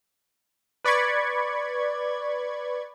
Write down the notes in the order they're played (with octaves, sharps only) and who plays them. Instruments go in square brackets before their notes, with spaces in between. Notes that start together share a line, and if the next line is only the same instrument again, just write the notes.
[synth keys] B4 D5 B5 C#6 G#6